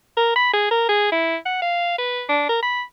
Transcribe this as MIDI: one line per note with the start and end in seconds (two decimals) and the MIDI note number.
0.17 0.34 70
0.36 0.49 83
0.53 0.70 68
0.71 0.88 70
0.89 1.09 68
1.12 1.36 64
1.45 1.61 78
1.62 1.95 77
1.98 2.23 71
2.29 2.44 62
2.49 2.59 70
2.62 2.82 83